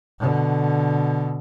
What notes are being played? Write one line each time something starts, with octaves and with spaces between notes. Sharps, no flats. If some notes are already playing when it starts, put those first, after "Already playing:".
B2 D3